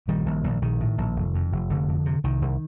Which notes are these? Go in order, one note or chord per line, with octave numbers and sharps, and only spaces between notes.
A#1 D#3 G3
A#1
A#1
A#1 D#3
A2
A#1
F1
F2
F1
F1 D3
F2
C3
C2 D#3
C2